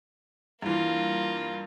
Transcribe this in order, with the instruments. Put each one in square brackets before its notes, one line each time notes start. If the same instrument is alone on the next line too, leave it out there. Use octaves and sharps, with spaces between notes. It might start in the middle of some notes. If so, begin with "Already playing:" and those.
[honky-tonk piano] G2 E3 [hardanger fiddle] A#3 F4